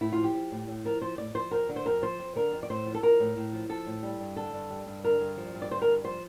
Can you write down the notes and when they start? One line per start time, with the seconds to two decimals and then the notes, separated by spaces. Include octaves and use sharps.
0.01 A2 E4
0.12 F3 F4
0.24 G4
0.34 F3
0.51 A2
0.68 A2
0.84 F3 A#4
1.01 F3 C5
1.18 A2 D5
1.35 F3 C5
1.51 F2 A#4
1.69 D3
1.76 C5
1.86 F2 A#4
2.02 F3 C5
2.19 F2
2.35 D3 A#4
2.52 F2
2.63 D5
2.70 A2 C5
2.86 F3
2.95 A4
3.03 F3 A#4
3.20 A2
3.37 A2
3.53 F3
3.69 F3 A4
3.86 A2
4.03 G3
4.20 G2
4.36 D3 A4
4.53 G2
4.70 G3
4.87 G2
5.04 D3 A#4
5.20 G2
5.37 F3
5.54 G2
5.62 D5
5.71 D3 C5
5.82 A#4
5.88 G2
6.04 F3 C5